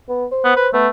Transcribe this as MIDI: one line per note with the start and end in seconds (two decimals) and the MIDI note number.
0.09 0.26 59
0.32 0.72 72
0.45 0.54 59
0.57 0.68 71
0.74 0.88 57
0.74 0.89 59